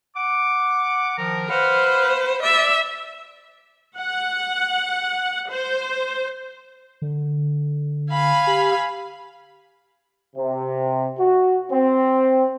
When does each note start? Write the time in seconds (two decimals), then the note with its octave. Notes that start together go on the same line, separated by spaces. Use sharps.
0.16 F#5 D6
1.17 D#3 F3 A#4
1.49 B4 C5 F5 F#5 F6
2.43 D5 E5
3.97 F#5
5.50 C5
7.02 D3
8.11 F5 G#5 B5
8.47 G4
10.35 C3
11.18 F#4
11.70 C4